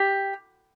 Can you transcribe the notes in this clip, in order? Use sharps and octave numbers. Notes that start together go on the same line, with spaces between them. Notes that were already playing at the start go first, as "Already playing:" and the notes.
Already playing: G4